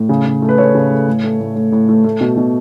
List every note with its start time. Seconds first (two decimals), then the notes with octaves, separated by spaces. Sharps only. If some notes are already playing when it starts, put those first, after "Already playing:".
Already playing: A2
0.09 C#3
0.26 C#3
0.42 A3
0.49 B4
0.58 A3 C#5
0.75 C#3
0.90 A3
1.08 A2
1.24 A3
1.40 A2
1.56 A3
1.72 A2
1.89 A3
2.04 A3
2.21 B2
2.37 B2